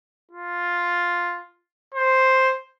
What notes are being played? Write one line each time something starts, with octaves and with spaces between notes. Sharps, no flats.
F4
C5